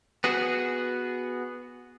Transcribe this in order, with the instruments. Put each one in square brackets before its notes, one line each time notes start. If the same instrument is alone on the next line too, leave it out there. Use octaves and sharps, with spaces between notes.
[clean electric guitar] B3 F#4 G#4